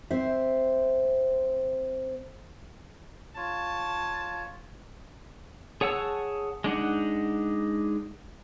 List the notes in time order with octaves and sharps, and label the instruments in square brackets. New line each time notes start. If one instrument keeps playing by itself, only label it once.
[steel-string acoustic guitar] C4 C5 E5
[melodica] F4 C#5 [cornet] A5
[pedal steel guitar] G#4 C#5 F#5 A5 E6
G#3 D4 D#4 F#5